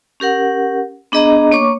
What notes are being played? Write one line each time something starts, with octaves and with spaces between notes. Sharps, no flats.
C#4 G4 A#4 F#5
B3 D4 G#4 D#5 A#5 D6
A#3 C#5 C#6 D6